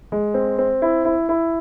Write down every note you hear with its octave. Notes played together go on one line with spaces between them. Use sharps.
G#3
C4
C4
E4
E4
E4